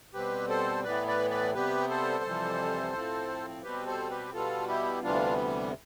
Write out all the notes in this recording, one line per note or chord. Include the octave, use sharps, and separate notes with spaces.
B2 G3 C4 G4 B4
A4 C5
A2 E3 B3 B4 D5
B4 D5
B4 D5
C3 G3 B3 G4 B4
A4 C5
F2 C3 E3 G3
A2 F3 C4
B2 G3 C4 G4 B4
A4 C5
G4 B4
B2 G3 B3 F4 A4
E4 G4
D2 C3 E3 G3 B3 D4 F4